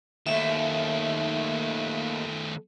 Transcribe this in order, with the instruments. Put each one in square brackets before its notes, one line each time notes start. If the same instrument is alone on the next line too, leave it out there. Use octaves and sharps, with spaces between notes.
[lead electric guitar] D#2 [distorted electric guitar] D#3 A3 [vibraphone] E5